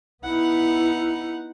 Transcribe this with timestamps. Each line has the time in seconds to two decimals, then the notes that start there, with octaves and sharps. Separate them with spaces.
0.24 B3 D#4 E4 F#5